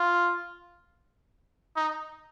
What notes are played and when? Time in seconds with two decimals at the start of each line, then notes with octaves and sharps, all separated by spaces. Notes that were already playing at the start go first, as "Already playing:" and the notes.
Already playing: F4
1.76 D#4